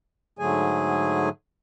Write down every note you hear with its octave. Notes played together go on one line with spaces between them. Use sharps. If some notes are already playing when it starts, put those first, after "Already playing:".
G#2 D3 F#3 A3 G#4 G#5